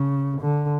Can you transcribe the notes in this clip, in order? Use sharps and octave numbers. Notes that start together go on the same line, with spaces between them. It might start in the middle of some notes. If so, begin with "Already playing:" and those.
Already playing: C#3
D3